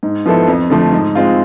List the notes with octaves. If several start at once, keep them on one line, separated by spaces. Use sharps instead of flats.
G#2
F3 B3 E4 A4
F2
D3 F3 A3
G#2
G#3 C4 F4